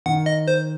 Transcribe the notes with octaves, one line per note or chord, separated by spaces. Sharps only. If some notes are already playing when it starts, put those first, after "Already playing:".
D#3 F#5
D#5
C5